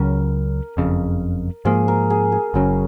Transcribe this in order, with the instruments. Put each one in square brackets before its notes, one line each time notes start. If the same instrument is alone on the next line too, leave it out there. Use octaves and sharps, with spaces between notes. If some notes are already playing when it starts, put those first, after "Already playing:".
Already playing: [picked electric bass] C#2 C#3 F#3 C#4 [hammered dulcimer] A#4
[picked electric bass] F#1 F2 C#3
[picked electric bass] G#2 F3 A#3 [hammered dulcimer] G#4
[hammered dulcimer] A#4
G#4
G#4
[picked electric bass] F#1 F#2 C#3 F#3 [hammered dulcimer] C#4